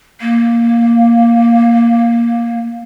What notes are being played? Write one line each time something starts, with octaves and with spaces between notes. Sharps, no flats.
A#3